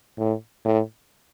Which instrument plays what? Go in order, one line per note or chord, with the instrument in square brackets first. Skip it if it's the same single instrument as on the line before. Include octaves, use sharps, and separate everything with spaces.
[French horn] A2
A2